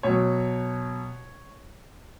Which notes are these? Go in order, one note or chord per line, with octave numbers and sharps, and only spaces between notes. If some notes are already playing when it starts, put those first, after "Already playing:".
B2 F#3 C#5